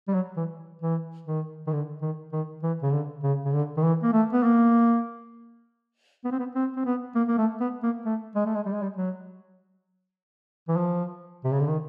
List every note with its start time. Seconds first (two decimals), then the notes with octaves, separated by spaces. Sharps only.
0.08 G3
0.14 F#3
0.37 E3
0.82 E3
1.27 D#3
1.67 D#3
1.72 D3
2.02 D#3
2.32 D#3
2.63 E3
2.83 C#3
2.93 D3
3.23 C#3
3.45 C#3
3.53 D3
3.77 D#3
3.83 E3
4.03 A#3
4.13 A3
4.33 B3
4.44 A#3
6.25 B3
6.32 C4
6.39 B3
6.55 C4
6.76 C4
6.85 B3
7.15 A#3
7.28 A#3
7.38 A3
7.60 B3
7.83 A#3
8.06 A3
8.35 G#3
8.46 A3
8.55 G#3
8.66 G3
8.74 G#3
8.83 G3
8.96 F#3
10.68 E3
10.77 F3
11.44 C3
11.52 C#3
11.60 D3
11.67 D#3